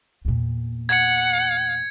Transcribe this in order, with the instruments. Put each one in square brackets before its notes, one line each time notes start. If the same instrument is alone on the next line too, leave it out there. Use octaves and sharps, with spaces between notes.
[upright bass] E2 A#2
[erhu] F#5 [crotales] G#6 C#7